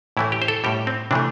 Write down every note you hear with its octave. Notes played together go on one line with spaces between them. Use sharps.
A2 E3 A3 E4
G4
C5
A4
A2 G3 G4
C4
C3 E3 A3 D4